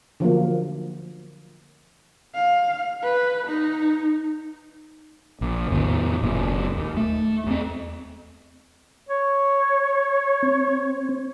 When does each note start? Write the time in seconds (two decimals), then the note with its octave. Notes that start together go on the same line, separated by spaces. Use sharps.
0.20 D3 F3 F#3 A#3
2.35 F5
3.03 B4
3.47 D#4
5.41 A#1
5.70 E2 A2 D#3 B3
6.23 F#1 A#2
6.77 D#2
6.97 A3
7.46 E2 C4
9.09 C#5
10.43 C4